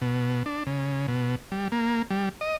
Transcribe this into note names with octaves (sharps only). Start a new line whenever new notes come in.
B2
D4
C#3
B2
G3
A#3
G3
D#5